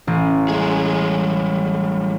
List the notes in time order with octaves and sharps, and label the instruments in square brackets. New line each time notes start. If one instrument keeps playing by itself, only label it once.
[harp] A1
[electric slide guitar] G3 G#3 G#4